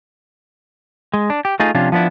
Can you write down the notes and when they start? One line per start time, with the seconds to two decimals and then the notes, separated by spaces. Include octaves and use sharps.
1.14 G#3
1.30 D4
1.45 G4
1.60 A3 D#4 F4 G#4
1.75 C3 F3 C#4 D4 F4
1.92 F3 B3 D4 E4